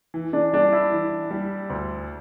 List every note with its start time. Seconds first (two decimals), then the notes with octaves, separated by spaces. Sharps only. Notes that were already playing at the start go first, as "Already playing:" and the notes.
0.14 E3
0.33 D4
0.53 G3 D4
0.72 E4
0.92 E3
1.31 G3
1.70 D2